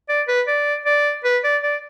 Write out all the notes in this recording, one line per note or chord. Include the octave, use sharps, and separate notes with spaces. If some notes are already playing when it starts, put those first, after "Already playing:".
D5
B4
D5
D5
B4
D5
D5